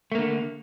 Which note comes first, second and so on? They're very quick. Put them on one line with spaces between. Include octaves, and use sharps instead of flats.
A3 A#3 D3